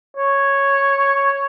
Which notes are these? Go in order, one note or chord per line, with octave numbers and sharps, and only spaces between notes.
C#5